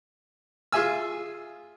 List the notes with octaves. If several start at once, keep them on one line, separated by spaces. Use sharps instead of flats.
F4 G#4 E5 G#5 E6